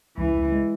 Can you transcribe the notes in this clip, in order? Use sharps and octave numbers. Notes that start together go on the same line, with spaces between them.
C#2 E3
C#2
G#3